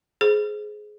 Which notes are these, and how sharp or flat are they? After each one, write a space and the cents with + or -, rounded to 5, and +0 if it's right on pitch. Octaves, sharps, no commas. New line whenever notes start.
G#4 +20 C5 +5